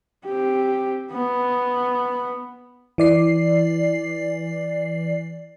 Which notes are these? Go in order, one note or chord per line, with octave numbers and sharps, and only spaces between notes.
C4 G4
B3
E3 D5 C7